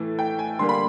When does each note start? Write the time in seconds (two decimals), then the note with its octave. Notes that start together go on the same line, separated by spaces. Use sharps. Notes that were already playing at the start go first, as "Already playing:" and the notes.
Already playing: A2 E3 A3
0.19 G5
0.39 G#5
0.59 D3 G3 A#3 C6
0.69 B5